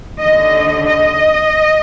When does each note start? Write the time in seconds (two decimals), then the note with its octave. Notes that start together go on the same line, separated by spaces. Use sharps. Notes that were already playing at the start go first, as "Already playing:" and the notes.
0.21 D#2 D3 D#5
0.86 D#5